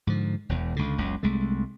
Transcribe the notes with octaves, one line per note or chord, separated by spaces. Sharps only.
G#2 D3 F3
E1 E2
C#2 D3
F#1 C#2
C2 G#3 A3